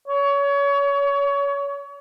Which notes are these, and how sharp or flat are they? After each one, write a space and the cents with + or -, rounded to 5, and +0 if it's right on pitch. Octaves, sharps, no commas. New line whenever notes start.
C#5 +30